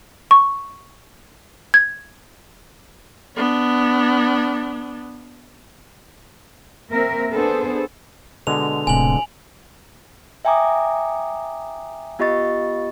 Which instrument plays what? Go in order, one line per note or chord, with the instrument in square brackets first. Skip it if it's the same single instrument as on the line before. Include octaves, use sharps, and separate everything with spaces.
[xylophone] C#6
G#6
[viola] B3 D4
[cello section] A#3 C4 A#4 E5
B3 D4 G#4 A4 C5
[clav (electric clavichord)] B2 D3 G#3 [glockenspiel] F7
[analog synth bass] D1 [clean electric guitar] A2 C3 [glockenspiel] G#5 F#7
[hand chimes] E5 G5 G#5 A#5 D6 D#6
B3 F4 G4 D#5 C#6 A6